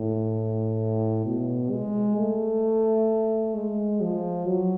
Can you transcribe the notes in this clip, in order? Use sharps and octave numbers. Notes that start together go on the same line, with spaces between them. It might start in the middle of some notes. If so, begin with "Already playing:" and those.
Already playing: A2
B2
G#3
A3
G#3
F3
F#3